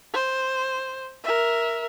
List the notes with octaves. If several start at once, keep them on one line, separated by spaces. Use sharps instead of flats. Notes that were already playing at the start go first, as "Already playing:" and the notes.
C5
A#4 E5